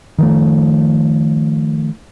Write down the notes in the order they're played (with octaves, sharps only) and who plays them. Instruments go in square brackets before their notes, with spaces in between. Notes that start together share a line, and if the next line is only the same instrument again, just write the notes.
[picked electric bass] D#3 F3 A3